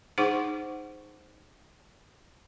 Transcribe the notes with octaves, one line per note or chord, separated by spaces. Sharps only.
D#4 G#4 C5 F#5 C#6 D6